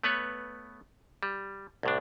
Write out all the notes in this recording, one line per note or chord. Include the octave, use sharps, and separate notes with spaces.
A3 B3 B4 C#5
G3
C2 A2 D4